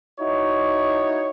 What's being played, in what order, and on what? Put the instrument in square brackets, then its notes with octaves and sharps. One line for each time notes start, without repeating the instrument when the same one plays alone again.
[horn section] D#4 E4 F#4 C#5